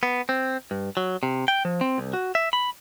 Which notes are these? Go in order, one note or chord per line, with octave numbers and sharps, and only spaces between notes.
B3
C4
G2
F#3
C3
G5
F3
C4
C2
F#4
E5
B5